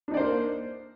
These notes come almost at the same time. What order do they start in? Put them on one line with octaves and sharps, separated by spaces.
D4 D#4 D5 C5 A#3